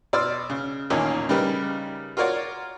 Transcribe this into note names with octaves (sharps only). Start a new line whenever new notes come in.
B2 D5 C6 E6 F6
C#3
A1 E2 A#2 D#3 C#4
C#3 G3 D#4 G4 A#4 B4
F4 F#4 A#4 C#5 D5 F#5